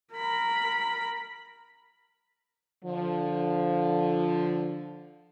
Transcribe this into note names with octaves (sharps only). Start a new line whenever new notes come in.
A#4 B5
D3 F3